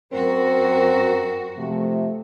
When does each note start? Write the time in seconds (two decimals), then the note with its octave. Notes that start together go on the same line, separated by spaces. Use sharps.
0.13 F#2 C4 F#4 A#4
1.58 C3 F3 A3